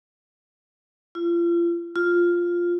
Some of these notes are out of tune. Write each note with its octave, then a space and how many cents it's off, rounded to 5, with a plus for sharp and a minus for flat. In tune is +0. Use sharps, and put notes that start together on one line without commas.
F4 -35
F4 +0